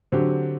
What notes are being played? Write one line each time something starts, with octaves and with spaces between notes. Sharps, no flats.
D3 F#3 C4 G4